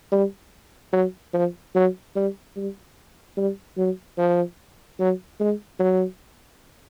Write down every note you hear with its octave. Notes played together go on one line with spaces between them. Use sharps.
G3
F#3
F3
F#3
G3
G3
G3
F#3
F3
F#3
G#3
F#3